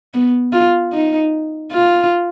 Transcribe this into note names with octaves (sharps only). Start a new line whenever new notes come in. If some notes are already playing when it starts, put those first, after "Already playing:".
B3
F4
D#4
F4